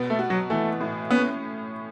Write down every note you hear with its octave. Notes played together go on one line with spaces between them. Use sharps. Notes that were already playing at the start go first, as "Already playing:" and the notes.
Already playing: B2 B3
A3
F#4
F#3
E3 A3
A2
B3 C#4